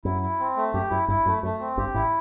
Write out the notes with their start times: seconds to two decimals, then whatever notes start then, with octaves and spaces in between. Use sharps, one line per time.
0.05 F#2 E4
0.22 E4
0.40 C4
0.57 A3
0.74 F#2 G4
0.91 F#2 E4
1.08 G1 G2 E4
1.26 F#2 A3
1.43 F#2 A3
1.60 C4
1.77 G1 G2 G4
1.94 A1 A2 E4